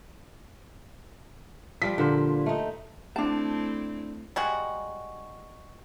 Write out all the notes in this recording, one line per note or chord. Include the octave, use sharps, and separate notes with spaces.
F3 G3 F4 B6
A#2 D3 C5
A3 D#4
A3 C4 D4 E4 A5
G3 G#3 F#4